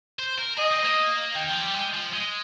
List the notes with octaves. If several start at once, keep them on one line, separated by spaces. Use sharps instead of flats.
C5
A#4
G#4 D#5
C4
A#3
D#3 G5
F3
G3
G#3
F3
G#3